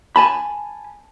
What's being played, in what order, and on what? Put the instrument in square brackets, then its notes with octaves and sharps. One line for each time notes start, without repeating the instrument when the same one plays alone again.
[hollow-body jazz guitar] G#5 A5 B5